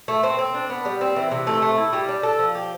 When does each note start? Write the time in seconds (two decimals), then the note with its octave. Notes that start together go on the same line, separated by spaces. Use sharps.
0.08 A3
0.23 C4
0.39 C4
0.54 D4
0.70 B3
0.85 G3
1.01 C4
1.16 E3
1.31 C3
1.47 A3
1.62 A3
1.78 E4
1.93 G3
2.09 D4
2.23 A4
2.39 F3
2.55 G4